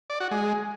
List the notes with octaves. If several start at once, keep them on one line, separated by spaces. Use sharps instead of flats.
D5
F#4
G#3